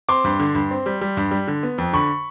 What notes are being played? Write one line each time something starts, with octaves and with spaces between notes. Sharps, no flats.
C4 C6 D6
G2
D3
G2
C4
G3
G3
G2
G3
D3
B3
F2
D3 B5 C#6